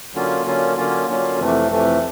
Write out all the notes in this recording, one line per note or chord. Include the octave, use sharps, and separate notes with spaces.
D3 F#3 A#3 C#4 F4
D3 F#3 A#3 C#4 F4
D3 F#3 A#3 C#4 F4
D3 F#3 A#3 C#4 F4
F2 C3 E3 A3
F2 C3 E3 A3